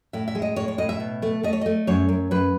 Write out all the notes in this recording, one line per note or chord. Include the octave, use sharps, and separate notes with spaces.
A2 E5
E5
G#3
D#5
A2 C#5
C#5
A2 D#5
E5
B2
A3
A3 D#5
C#5
A3 D#5
F#2 C#5
F#2
F#2 B4